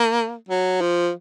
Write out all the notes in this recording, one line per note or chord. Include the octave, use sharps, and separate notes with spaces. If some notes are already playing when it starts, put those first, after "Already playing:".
Already playing: A#3
F#3
F3